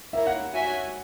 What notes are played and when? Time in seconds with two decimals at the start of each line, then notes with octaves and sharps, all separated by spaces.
0.13 A#3 E4 A#4 C#5 E5
0.27 F#5
0.53 F#4 C#5 E5 G#5